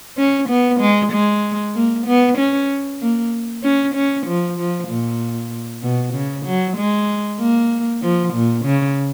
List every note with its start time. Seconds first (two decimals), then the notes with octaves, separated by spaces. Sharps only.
0.18 C#4
0.49 B3
0.81 G#3
1.13 G#3
1.74 A#3
2.07 B3
2.38 C#4
3.01 A#3
3.63 C#4
3.95 C#4
4.27 F3
4.58 F3
4.89 A#2
5.82 B2
6.15 C#3
6.46 F#3
6.78 G#3
7.40 A#3
8.02 F3
8.34 A#2
8.66 C#3